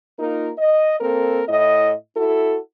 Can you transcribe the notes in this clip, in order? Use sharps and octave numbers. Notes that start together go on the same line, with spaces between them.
A#3 D#4 F4 A#4
D#5
A#3 C4 A4 A#4
A2 E4 D#5
E4 F#4 A4